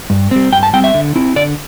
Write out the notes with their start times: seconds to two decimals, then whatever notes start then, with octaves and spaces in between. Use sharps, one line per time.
0.10 G2
0.31 G3 C4
0.52 G2 G5
0.63 A5
0.73 G3 C4 G5
0.84 E5
0.94 D3
1.15 C4 E4
1.36 D3 D5